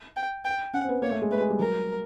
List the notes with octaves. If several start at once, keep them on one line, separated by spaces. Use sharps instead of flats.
G5
G5
C#4 F#5
C4
B3
A#3 C#5
A3
G#3
A3 B4
G#3
G3
F#3 A#4